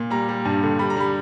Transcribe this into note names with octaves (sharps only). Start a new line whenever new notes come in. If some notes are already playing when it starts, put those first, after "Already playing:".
Already playing: A#2
G3 A#5
G3
G2
D3
G3 B5
A#5
G3 B5